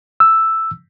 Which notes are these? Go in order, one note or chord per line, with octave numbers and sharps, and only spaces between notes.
E6